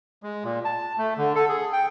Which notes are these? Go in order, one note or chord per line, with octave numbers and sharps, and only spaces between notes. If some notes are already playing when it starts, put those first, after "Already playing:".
G#3
A#2
A5
A3
D3
A4
G#4
G5